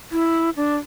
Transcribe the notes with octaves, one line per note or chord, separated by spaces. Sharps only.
E4
D4